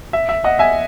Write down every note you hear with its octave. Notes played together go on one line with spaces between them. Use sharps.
E5
E5
D#5 F#5
E5 G#5